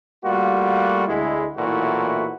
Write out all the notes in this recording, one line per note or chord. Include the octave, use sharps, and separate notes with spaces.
G3 A3 A#3 F4 F#4
D2 G#3 E4
B1 A#2 E3 A3 E4 F#4